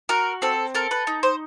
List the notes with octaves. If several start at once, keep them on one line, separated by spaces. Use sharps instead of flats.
F#4 A#4
C4 A4
A4 A#4
B4
D#4
C5